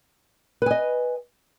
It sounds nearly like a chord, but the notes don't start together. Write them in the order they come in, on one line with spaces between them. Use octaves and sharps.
B4 G#5 D#5